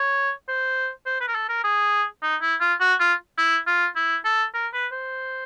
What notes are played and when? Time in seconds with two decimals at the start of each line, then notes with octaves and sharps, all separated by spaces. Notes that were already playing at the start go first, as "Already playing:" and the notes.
Already playing: C#5
0.48 C5
1.05 C5
1.20 B4
1.27 A#4
1.35 A4
1.49 A#4
1.64 G#4
2.22 D#4
2.41 E4
2.60 F4
2.80 F#4
3.00 F4
3.37 E4
3.67 F4
3.96 E4
4.24 A4
4.54 A#4
4.73 B4
4.92 C5